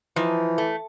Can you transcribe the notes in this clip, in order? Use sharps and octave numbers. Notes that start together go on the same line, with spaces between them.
E3 F3 D#4
A3